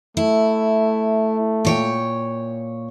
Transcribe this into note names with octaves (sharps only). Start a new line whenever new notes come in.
A3 E4
A#2 C#5 G5